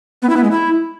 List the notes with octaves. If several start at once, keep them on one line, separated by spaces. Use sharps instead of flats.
B3
E4
B3
G#3
E4